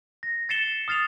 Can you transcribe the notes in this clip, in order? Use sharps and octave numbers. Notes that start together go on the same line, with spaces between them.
A#6
A6 C7 C#7 E7 G7
D#6 F6 A6 C7 F7